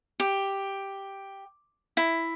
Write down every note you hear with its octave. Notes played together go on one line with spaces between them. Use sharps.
G4
E4